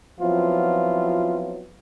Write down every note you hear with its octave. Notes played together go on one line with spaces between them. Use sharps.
F3 F#3 B3 C4 E4 F4